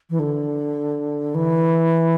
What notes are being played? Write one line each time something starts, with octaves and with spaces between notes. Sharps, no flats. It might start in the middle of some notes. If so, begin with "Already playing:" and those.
E3
D3
E3